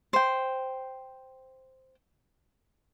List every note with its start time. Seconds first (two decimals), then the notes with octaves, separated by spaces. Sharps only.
0.13 C5 G5